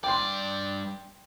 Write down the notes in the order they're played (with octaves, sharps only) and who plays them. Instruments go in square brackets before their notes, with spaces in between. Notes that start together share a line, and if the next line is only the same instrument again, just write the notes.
[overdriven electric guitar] G2 D5 [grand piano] G5 C6